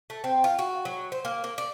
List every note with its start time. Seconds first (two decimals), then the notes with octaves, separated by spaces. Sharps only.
0.10 A3
0.24 C4
0.44 F4
0.59 F#4
0.85 F#3
1.12 C5
1.25 A#3
1.44 A#3
1.58 D5